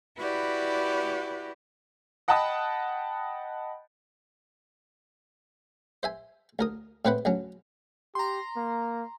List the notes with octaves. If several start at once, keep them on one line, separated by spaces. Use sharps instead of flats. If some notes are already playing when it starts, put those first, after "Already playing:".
E4 F#4 G4 B4 D5
D#5 F#5 G5 A5 B5 D#6
C5 E5 G#5
D2 A#4 D#6
A2 C4 B4 C5 F#5 B5
D2 F#3 C#4
G4 A#5 C6
A#3